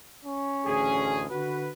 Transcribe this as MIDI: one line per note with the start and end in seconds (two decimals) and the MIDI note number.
0.25 1.38 61
0.66 1.25 33
0.66 1.25 38
0.66 1.25 68
1.31 1.70 50
1.31 1.70 66
1.31 1.70 71